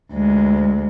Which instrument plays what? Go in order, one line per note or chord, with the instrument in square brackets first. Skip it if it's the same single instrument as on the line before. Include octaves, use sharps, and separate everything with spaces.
[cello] D2 G#3